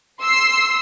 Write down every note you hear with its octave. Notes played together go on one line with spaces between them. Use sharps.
C6 E6 C7